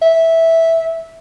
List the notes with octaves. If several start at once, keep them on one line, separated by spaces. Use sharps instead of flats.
E5